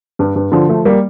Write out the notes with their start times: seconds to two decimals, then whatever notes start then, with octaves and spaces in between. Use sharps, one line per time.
0.19 G2
0.36 G2
0.52 D3 F3
0.69 F3 A3
0.85 G3 A#3